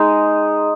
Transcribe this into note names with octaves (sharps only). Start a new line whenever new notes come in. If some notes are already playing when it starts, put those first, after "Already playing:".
Already playing: G#3 D#4